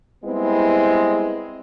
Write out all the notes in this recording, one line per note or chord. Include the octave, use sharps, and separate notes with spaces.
G3 G#3 B3 C4 E4